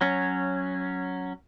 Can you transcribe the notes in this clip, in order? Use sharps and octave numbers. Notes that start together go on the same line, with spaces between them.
F#3 C#4